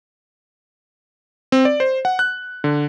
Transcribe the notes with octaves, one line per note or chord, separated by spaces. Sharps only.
C4
D5
C5
F#5
F#6
D3